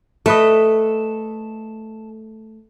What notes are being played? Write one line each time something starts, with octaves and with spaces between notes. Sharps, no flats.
A3 A4 B4 D#5